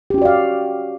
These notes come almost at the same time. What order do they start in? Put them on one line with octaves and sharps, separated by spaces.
G4 C#4 F#4 D5 F5